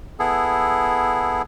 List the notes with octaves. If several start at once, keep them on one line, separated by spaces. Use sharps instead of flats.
B3 E4 G#4 A4